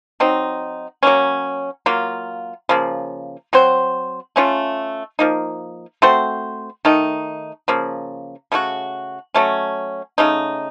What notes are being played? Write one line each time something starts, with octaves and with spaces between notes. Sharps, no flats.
F#3 C4 D#4
F#3 A#3 C#4
F#3 A#3 F4
C#3 F3 A#3
F#3 C4 F#4 C5
A3 C#4 F4
F3 A#3 D#4
A3 C4 F#4 C5
D#3 A3 D#4
C#3 F3 A#3
C#3 A3 C#4 F#4
F#3 A3 C#4
C#3 A3 D#4